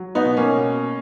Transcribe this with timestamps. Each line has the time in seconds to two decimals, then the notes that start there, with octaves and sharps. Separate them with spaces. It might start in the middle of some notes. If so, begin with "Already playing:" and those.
Already playing: F#3
0.15 B3 D#4
0.25 B2
0.37 A#3 C#4
0.57 B2